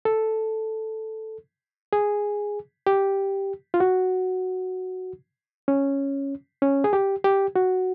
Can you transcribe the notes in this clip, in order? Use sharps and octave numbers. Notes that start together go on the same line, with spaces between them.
A4
G#4
G4
F4
F#4
C#4
C#4
G#4
G4
G4
F#4